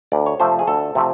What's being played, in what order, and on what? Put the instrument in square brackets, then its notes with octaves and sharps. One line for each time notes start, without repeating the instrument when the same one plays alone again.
[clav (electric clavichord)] D2 D5
C#5
C3 F3 A3 C5
G#4
D2 A4
C3 F3 A3